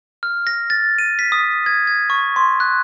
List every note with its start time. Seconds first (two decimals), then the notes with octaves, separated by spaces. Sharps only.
0.23 F6
0.47 A#6
0.70 A6
0.98 D#7
1.19 B6
1.32 D#6
1.66 G#6
1.87 G#6
2.10 C#6
2.36 C6
2.60 F#6